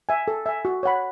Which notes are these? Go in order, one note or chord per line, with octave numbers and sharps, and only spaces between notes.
E5 G#5
A4
E5 G#5
F#4
C#5 F#5 B5